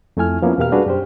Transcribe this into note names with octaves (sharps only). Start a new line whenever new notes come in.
F2 A3 E4 G#5 F6
F3 A#3 B3 C#4 E4
E2 B2 G4 A#4 F5 F6
G3 D4 F#4 G#4 B4
F#2 G4 C5